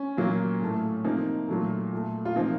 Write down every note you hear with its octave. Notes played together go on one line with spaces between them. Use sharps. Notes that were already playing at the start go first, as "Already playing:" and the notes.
Already playing: C#4
A#2 F#3 A#3
A2 A3
C3 F3 A#3 D#4
A#2 F#3 A3
A#2 A3
F4
C3 F3 A#3 D#4